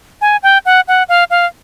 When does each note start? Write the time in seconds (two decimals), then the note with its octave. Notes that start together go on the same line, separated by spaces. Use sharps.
0.21 G#5
0.43 G5
0.65 F#5
0.88 F#5
1.09 F5
1.30 F5